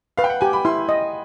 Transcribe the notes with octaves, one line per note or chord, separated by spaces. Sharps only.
B4 F5
G5
F#5
G4 G#5
B5
E4 C6
D#5